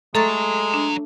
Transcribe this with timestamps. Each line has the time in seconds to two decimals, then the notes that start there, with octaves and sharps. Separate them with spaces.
0.15 F#3 G#3 A3 A4 A#5 A6
0.74 D4